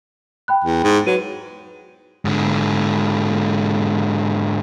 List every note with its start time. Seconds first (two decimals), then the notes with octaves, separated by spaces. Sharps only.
0.48 G5 B5 F#6
0.64 E2
0.84 G#2
1.07 F#3 F#4 B4 D#7
2.25 G#2 D3